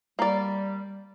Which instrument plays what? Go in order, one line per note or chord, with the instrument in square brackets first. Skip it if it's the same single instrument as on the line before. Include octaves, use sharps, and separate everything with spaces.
[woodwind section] G3 [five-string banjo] A#3 D5